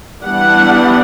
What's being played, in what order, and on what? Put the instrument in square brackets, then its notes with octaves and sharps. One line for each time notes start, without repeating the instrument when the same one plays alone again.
[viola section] E3 G3 B3 D4 F#5